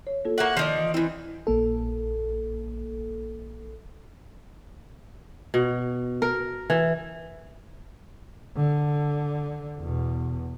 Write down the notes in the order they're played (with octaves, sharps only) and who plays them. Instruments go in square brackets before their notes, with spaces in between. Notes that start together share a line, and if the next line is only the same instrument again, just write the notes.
[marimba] C#5
A#3 F4 A4
[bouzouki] A#3 F#4 F#5 [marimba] E5
[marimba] D#3 [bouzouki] F3 D#4 D5
[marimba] E3
[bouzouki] E3 C4 [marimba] E4
[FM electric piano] A#1 A#3 A4
[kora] B2
A#4
E3
[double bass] D3
E2 B2